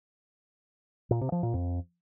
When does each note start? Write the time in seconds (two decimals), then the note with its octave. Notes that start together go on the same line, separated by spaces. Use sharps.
1.11 A#2
1.21 C3
1.32 F3
1.43 A#2
1.54 F2